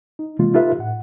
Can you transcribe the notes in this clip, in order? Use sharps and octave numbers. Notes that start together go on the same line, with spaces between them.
D#4
C3 E3 G#3 A#3 C#4 F4
D#4 F4 G4 A4 B4 E5
A2 F#5